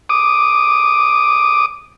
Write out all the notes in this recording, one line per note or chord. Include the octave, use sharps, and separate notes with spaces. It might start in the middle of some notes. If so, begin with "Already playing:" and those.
D6 D#6